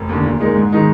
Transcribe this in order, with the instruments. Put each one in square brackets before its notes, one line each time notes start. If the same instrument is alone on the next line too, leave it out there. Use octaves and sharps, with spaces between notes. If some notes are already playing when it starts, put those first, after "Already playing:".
Already playing: [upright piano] F1
D#2 D3
A#2
G#3 D#4 A#4
G#2
D#3 G#3 D#4